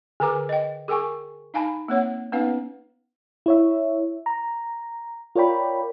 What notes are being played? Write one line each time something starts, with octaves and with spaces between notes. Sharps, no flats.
D3 A#4 B4 G#5 A#5 D6
D#5 G5
G#4 A#4 G5 G#5 C#6
D#4 F5 G#5 A5 B5
A#3 C4 C#5 F#5
B3 C#4 D#4 B4 F5
E4 C#5 E5
A#5
F4 A#4 C#5 D5 G5 B5